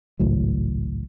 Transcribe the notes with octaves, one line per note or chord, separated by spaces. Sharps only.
G#1 C#2 A2 F#3